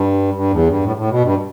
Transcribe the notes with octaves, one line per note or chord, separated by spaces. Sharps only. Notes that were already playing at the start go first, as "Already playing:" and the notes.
Already playing: G2
G2
E2
G2
A2
A2
B2
G2